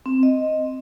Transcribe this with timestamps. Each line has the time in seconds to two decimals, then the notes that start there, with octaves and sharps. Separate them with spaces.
0.06 C4
0.23 D#5